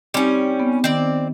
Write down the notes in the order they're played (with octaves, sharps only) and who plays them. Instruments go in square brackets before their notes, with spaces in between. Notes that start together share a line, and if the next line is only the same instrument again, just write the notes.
[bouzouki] G3 C#4 [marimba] C4 D#4 G4
[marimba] B3
[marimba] D#3 [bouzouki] C4 D5